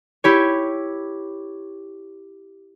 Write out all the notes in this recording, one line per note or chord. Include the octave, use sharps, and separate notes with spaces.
E4 G4 C#5